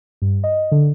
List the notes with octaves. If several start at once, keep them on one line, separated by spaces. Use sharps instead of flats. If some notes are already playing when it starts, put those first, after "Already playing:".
G2
D#5
D3